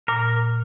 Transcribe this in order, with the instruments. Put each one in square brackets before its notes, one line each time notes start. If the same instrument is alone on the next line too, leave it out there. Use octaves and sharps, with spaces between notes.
[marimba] A#2 [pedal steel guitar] A#4